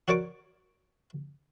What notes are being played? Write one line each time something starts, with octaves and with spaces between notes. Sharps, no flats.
F#4 A#4 C#5 D5 C#6 D6